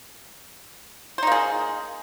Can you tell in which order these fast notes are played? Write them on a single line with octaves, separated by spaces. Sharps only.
C5 D#4 A#3 G#4